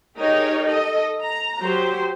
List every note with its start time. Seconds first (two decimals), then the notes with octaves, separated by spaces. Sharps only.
0.19 D#4 G4 G#4 A#4 C#5
0.65 A4 D#5
1.22 A#5
1.60 F#3 G4 C5